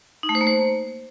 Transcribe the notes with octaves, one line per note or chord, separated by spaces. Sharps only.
D#4
A3
C5
A#3
C5